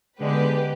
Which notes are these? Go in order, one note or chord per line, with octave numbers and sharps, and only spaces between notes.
D3 G#3 B3 G4 B4